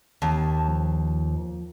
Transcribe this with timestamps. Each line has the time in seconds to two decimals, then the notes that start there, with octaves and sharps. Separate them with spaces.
0.22 D#2 A5
0.68 F3